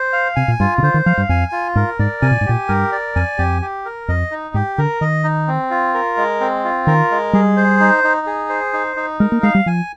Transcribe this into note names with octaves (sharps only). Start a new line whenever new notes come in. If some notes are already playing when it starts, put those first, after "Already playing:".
Already playing: C5
F5
C3 G#5
A#2
G2 F4
C3
D3 C5
D#3
F3 F5
G2
F2 G#5
F4
G#2 A#4
G#2 D5
C3 G#5
A#2
G#2
A#2 G4
G2 A#4
D5
F2 G#5
F2 G4
G4
A#4
F2 D#5
D#4
G#2 G4
D3 A#4
D#3 D#5
D#4
C4
F4
A#4
G#3
C4
F4
D#3 A#4
G#3
G3 G#4
C5
D#4
D#4
G#4
C5
D#4
D#4
G#3 A#4
A#3
G#3 F5
G3
F3 G#5